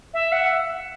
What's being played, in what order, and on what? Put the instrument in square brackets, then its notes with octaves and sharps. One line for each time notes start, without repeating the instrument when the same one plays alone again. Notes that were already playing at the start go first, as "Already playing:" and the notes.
[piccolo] E5
F#5